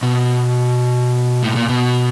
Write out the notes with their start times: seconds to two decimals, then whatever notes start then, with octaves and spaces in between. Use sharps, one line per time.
0.03 B2
1.43 A2
1.56 A#2
1.69 B2